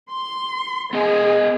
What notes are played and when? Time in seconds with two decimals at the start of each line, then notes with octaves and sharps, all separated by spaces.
0.11 C6
0.93 B3 G#4 D#5 G#5